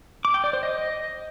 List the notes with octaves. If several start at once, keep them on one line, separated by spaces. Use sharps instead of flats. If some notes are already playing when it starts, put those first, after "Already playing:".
D6
G5
D5
C5
D#5